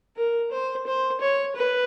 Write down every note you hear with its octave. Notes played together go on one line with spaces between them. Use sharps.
A#4
C5
C5
C#5
B4